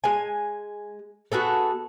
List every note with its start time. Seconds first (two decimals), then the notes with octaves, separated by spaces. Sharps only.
0.04 G#3 G#5
1.32 B3 F#4 G#4 A4